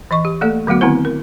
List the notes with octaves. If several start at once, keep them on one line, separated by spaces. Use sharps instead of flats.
E3 D#5 C#6
G4
A3 A#3 A4 D5
D3 F#3 A3 B3 F#4
D3 D#3 B3 C4 E4 C5
A#4